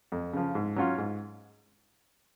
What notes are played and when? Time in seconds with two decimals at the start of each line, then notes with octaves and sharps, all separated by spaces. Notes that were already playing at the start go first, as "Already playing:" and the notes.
0.12 F2
0.33 C#3 F3
0.55 G#2
0.76 F#3 C#4 F4
0.98 G#2